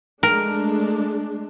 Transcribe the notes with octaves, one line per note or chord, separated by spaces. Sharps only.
G#3 A3 D4 A#4